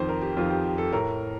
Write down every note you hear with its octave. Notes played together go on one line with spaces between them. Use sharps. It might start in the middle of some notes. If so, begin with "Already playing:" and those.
Already playing: F2 D#3 C5
A#4
G4
F2 D#3 F4
G4
G4
A4
A2 A#4